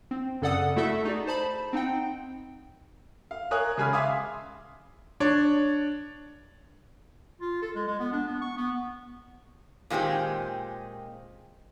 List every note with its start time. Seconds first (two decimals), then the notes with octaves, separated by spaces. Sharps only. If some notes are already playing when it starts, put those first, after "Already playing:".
0.11 C4
0.42 F#2 C#3 A4 D5 F#5 D#6
0.76 A3 E4 F#4 A4 E5
1.05 D#4 G#4 D5
1.27 C5 A5 B5
1.73 C4 D#4 F#5 G5
3.31 F5
3.51 A#4 C#5 G#5 D#6 F#6
3.77 C#3 G#3 G#4 G#5 B5 F6
3.93 E5 F5 G#5 C6 D6 D#6
5.20 D4 C#5
7.41 F4
7.62 A4
7.75 G#3
7.88 G#3
8.00 B3
8.12 D4
8.28 B3
8.41 C#6
8.57 B3
9.90 A#2 D#3 G#3 C4 G4